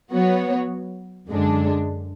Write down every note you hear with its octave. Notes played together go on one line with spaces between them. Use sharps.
F#3 B3 F#4 C#5
F#2 D3 G#3 D4